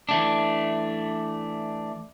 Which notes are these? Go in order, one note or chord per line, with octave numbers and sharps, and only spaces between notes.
E3 A3 D4